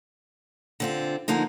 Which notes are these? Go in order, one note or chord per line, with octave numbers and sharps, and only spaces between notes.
D3 C4 F4
D3 F3 A#3 D#4